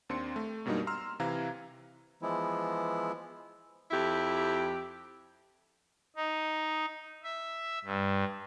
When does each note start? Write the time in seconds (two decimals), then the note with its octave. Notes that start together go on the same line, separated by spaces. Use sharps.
0.09 D#2 C4 D4 C6 C#7
0.36 A3
0.66 F#2 B2 G3 A#3 D4 D#4
0.87 A#5 C6 E6 F6
1.20 C3 E3 F5 A#5 G#6
2.22 E3 F3 G#3 B3 E4
3.91 F2 E4 G4
6.16 D#4
7.23 E5
7.85 G2